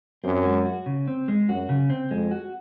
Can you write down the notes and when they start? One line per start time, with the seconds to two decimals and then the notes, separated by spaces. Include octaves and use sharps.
0.24 F#2 C4
0.45 G#3
0.65 F#4
0.86 C#3
1.08 C4
1.28 G#3
1.49 F#2 F#4
1.69 C#3
1.90 C4
2.11 F2 G#3
2.31 F#4